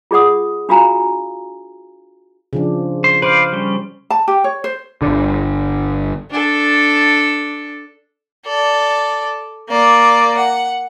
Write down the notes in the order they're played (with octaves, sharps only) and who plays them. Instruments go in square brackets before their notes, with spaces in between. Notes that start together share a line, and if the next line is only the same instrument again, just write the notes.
[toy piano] F4 G#4 D5 F#5 D#6
D4 F4 F#4 F5 G#5 A#5
[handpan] C#3 F3 D4
[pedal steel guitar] C5
[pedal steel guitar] B4 D5 F5 [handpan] C5
[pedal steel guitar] G3 C#4
[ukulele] A5
G4
C#5
C5
[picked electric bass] G1 D3
[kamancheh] D4 A4
[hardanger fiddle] A4 D5
A#3 D5
F#5